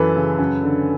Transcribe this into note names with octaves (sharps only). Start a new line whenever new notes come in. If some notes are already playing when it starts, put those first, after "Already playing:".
Already playing: F#2 E3 A4 B4
C#3
F#2
D3